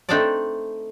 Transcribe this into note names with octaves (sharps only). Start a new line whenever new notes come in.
A3 C4 D4 D#4 A4 D5